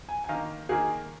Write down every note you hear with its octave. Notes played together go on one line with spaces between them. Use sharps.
G#5
G#5
D#3 A#3 F5
D#3 A#3 G#4